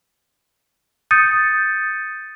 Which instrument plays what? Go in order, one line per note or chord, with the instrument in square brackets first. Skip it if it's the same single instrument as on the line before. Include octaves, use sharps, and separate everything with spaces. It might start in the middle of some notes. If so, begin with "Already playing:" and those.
[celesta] D#6 G6 A6 C#7 D#7